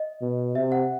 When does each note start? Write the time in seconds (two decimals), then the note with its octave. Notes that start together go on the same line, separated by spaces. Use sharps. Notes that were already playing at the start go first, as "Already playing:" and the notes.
Already playing: D#5
0.21 B2
0.55 C3 E5
0.72 F#5